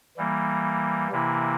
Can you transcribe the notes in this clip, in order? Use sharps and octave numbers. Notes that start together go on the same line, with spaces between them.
E3 G3 A#3
C3 E3 A#3 E4